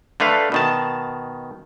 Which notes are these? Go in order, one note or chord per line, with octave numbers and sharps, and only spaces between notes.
D3 A3 B4 F5
B2 D#3 A5